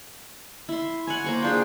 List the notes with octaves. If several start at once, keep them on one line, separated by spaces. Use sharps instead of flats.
E4 C6
C#5 F#5 G#5
A#3 C5 C#6
D4 F4 G#4 C5 G5